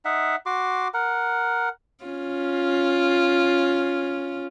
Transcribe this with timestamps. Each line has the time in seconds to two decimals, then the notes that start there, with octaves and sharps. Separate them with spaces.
0.05 D#4 E5 F#5
0.46 F#4 C6 D6
0.94 A#4 F#5
2.04 C#4 F4